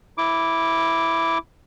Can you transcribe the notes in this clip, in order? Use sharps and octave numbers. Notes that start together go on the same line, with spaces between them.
E4 D6